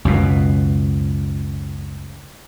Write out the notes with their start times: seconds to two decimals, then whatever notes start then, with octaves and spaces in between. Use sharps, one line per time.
0.05 C#2 F#2 B2